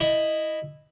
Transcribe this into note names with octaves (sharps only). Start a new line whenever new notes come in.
E4 D#5